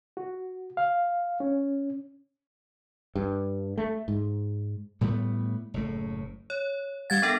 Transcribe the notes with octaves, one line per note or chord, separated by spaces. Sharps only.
F#4
F5
C#4
G2
A3
G#2
A2 G3 A3 B3
F#1 A2 A3
C#5
G3 F5 F#5 G#6 A6
B3 D4 A4 A#4 F#5